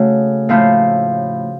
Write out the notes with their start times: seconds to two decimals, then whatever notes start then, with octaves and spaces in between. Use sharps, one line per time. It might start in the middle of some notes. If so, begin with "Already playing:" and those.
Already playing: C#3 A3 F#4
0.49 A2 F3 A3 F4